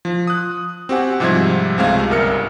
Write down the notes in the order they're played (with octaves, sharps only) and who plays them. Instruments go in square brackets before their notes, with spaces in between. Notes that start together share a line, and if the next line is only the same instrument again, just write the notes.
[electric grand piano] F3
D#6 F#6
C4 F#4 G4 F#5 G#5
G#2 C3 F3 G3 E5 G#6
C#2 C3 G#3 A3 F5 G#6
G1 C2 A#4 E5 F6 C#7